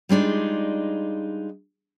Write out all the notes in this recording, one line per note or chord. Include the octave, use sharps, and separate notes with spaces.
G3 G#3 D4 D#4 F4